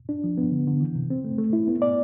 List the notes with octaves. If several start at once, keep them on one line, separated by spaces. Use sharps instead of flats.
D4
F3
B3
D3
D3
E3
C3
C4
A3
A3
E4
B3
D5